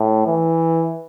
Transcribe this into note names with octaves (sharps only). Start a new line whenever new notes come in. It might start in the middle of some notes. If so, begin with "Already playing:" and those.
Already playing: A2
E3